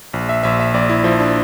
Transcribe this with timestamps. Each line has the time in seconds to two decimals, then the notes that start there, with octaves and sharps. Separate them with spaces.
0.14 A#1
0.29 E5
0.43 A#1 E5
0.59 E5
0.74 A#1 D5
0.89 E4
1.04 F3 E4
1.20 D4